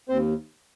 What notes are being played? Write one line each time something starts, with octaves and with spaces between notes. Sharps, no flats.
D#2 C4 C5